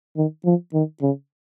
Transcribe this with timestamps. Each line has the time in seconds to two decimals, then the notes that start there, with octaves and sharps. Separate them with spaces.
0.17 D#3
0.45 F3
0.74 D#3
1.02 C#3